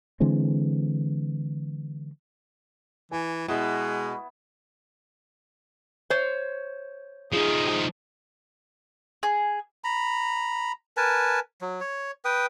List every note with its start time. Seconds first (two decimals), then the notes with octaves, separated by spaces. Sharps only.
0.20 D3 E3 G#3 C4
3.11 E3 G#5
3.48 B2 G#3 E4 D#6
6.10 C5 C#5
7.33 F3 D#4 G#4
9.23 G#4
9.84 A#5 B5
10.97 A#4 B4 G#5 A5
11.61 F#3
11.80 C#5
12.25 B4 G5 D#6